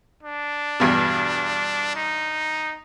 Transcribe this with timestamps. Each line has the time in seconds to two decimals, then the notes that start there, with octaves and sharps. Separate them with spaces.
0.23 D4
0.80 E2 G2 B2
1.96 D#4